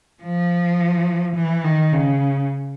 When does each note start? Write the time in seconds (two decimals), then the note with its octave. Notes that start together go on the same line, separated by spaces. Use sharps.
0.23 F3
1.36 E3
1.64 D#3
1.92 C#3